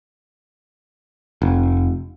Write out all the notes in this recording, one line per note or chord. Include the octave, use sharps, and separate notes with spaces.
F1